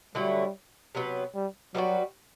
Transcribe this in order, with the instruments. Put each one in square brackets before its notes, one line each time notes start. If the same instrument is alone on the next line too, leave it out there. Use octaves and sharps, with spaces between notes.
[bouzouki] D3 F#3 A3 E4 [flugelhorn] G3
[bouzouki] C3 F#3 B3
[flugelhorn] G3
[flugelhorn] F#3 [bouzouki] G3 B3 D4 F#4